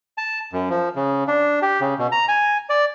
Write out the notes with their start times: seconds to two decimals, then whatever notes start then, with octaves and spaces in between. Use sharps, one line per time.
0.18 A5
0.53 F#2
0.70 F3
0.96 C#3
1.27 D4
1.62 G4
1.80 C#3
1.99 B2
2.12 A#5
2.28 G#5
2.69 D5